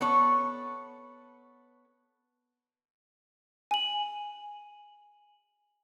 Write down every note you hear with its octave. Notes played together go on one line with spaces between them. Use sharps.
B3 A4 C#5
G#5 F#7